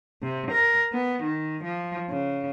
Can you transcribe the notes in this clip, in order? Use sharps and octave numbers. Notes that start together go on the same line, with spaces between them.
C3
A#4
B3
D#3
F3
C#3